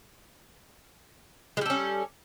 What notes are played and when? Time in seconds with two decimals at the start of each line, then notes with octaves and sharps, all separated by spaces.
1.57 G#3
1.61 G3
1.66 A4
1.70 C#4